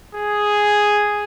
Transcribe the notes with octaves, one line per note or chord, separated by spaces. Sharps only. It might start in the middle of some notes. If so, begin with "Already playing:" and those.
G#4